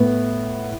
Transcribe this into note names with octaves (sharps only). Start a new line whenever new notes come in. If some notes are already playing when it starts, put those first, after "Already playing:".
Already playing: A2 B3